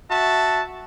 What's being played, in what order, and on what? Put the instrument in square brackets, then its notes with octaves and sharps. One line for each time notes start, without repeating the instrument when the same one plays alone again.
[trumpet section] F#4 E5 A5